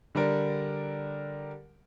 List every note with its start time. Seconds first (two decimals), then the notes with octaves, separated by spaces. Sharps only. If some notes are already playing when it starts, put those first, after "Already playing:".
0.15 D3 G3 D4 A#4